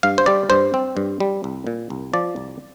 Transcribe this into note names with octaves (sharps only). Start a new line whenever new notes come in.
G2 F5
C5
G3 D5
G2 C5
C4
G2
G3
C2
A#2
C2
F3 D5
C2